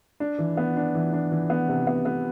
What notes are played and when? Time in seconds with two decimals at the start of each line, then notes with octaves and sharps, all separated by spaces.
0.20 D4
0.39 E3
0.57 B3
0.77 D4
0.95 E3
1.13 D4
1.32 E3
1.50 B3
1.69 C3
1.87 B3
2.05 B3